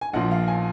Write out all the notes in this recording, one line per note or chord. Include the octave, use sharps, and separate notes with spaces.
G#5
A#1 A#2 F3 F#5
F5
G#5